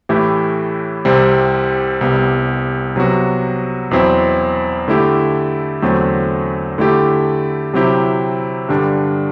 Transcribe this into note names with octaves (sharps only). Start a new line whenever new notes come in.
A2 E3 A3 E4 G4
C2 C3 G3 C4
C2 C3 G3 B3
C3 F#3 B3 F#4
E2 B2 F#3 C4 E4
D3 A3 E4 G4
E2 D3 F#3 A3 C4
D3 A3 E4 G4
C3 F#3 C4 E4 G4
G2 D3 G3 D4